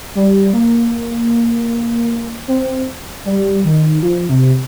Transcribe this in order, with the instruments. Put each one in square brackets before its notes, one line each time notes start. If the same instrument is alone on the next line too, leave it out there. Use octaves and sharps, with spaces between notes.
[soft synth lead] G3
A#3
C4
G3
D#3
F3
C3